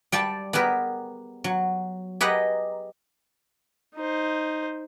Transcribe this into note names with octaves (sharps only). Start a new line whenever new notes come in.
G3 D5 G5 A5
B3 G4 G#4 A#4 B4
F#3
G4 G#4 B4 D#5 F#5 A#5
D#4 C5